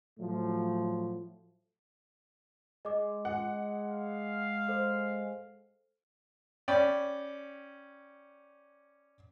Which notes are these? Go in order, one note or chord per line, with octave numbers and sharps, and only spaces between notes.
A2 F3 F#3 A3
G#3 D#5 D6
F#5
F5
A4 C5
C#4 D5 G5 B5